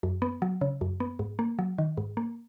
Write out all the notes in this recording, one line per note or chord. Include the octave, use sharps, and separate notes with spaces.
F#2
B3
F#3
C#3
F#2
B3
G#2
A#3
F#3
D#3
G#2
A#3